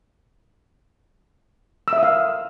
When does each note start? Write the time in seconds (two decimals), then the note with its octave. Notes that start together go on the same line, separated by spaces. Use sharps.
1.88 E6
1.93 E5
1.98 D#6
2.03 F5